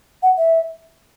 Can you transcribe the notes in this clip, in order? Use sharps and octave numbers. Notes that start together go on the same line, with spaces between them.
F#5
E5